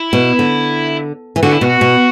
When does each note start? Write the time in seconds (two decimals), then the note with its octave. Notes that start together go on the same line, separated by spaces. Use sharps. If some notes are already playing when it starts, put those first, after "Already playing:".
Already playing: E4
0.13 B2
0.39 D3
1.36 E3
1.43 D3 F#4
1.53 E4
1.61 B2 F#4
1.81 B2